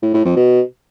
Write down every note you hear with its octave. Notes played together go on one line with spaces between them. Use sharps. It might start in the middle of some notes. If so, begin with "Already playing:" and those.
A2
A2
F2
B2